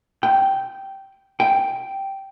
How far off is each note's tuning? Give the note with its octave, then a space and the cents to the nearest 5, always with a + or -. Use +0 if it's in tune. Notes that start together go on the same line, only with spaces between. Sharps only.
G5 -10
G5 -5